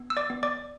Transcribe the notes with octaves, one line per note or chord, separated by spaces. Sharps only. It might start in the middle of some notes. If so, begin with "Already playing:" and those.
Already playing: B3
E6
D5 D6
B3
D5 D6